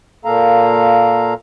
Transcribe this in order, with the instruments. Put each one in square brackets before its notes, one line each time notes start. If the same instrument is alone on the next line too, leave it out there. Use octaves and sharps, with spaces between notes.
[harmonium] A#2 A#3 A4 F5 A#5